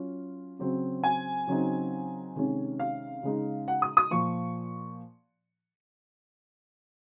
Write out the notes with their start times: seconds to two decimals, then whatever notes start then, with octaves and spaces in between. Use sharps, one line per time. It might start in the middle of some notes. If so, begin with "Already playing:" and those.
Already playing: F#3 C#4 F4
0.59 C#3 F#3 C4
1.04 G#5
1.47 C#3 F#3 C4 D#4
2.36 C3 D#3 G#3 C#4
2.80 F5
3.23 C#3 G#3 D#4
3.68 F#5
3.82 D#6
3.97 D#6
4.11 A#2 F3 C#6